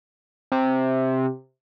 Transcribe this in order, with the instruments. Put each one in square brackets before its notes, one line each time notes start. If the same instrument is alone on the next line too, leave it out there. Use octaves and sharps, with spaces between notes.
[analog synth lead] C3